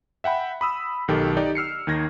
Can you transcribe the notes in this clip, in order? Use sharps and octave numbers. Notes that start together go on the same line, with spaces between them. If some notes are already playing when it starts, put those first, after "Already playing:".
E5 F#5 G5 B5
B5 D#6 E6
B1 D#3 G4 A4
D#4 G4 D5
E6 F6 C7 C#7
D#2 D#3 G#6 A#6